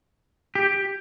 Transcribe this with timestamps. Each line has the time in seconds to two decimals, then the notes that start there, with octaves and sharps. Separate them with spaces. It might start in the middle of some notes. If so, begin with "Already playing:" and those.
0.55 G4